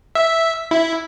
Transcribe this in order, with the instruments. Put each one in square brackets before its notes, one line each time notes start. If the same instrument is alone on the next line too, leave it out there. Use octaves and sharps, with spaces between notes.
[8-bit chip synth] E5
E4